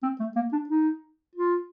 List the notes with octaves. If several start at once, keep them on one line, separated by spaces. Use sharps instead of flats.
C4
A3
A#3
D4
D#4
F4